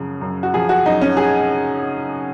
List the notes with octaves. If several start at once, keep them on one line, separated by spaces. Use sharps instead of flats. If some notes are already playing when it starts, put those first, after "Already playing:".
Already playing: F#2 C#3 F3
F#2
F#4
F3 G#4
F#4
F#2 D#4
C#4
G#4